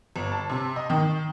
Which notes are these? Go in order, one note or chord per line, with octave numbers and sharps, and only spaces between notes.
G1
A5
C3
D#5
D#3